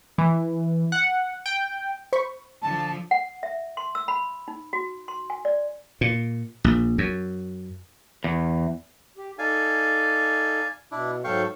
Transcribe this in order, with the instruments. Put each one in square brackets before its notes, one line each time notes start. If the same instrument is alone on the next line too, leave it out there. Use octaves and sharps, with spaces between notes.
[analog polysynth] E3
F#5
G5
[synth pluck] C5 B5 C#6
[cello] D3 F3 [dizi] A5
[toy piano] F#5
E5
C6
E6
B5
D#4
F#4
C6
G#5
D5
[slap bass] A#2
A#1
F#2
[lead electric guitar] E2
[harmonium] G4
[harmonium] D#4 A4 [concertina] D5 F5 G#5
[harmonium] B2 [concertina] D4 E4
[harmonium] G#2 F#3 A4 [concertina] F5 G5 C#6